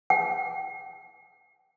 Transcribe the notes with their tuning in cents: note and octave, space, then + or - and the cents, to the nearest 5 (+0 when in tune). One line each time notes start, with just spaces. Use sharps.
G5 -40